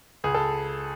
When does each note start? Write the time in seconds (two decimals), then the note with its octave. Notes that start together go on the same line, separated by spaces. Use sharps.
0.24 C#2 G#4
0.35 A4